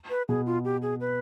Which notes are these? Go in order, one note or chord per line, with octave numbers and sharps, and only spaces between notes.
B4
B2 G#4
F4
G4
G#4
B4